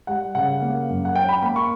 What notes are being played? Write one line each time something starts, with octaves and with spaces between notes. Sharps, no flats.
G3 F#5
C#3 F#5
A#3
F#2
F#5
C#4 G5
B5
A#3 B5
C#6